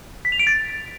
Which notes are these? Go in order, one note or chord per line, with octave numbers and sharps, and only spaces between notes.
B6
F7
D7
A6